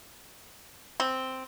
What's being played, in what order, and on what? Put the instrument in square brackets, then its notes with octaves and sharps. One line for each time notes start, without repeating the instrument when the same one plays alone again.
[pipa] C4